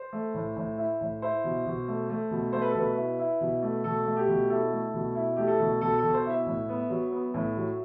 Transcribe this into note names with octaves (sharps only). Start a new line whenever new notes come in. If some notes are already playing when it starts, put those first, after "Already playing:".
Already playing: C5
A3
A2
A2
E4
A2
E4 C5
B2
B2
A3
A3
B2
A3 C5
B4
A4
B2 B4
E4
E4
B2
A3
B2 A4
A3
G4
B2
E4 A4
A3
B2
E4
A3 G4
A4
B2
B2 A4
B2 A4
C5
E4 E5
A2
B3
F#3
B3
A2
F#3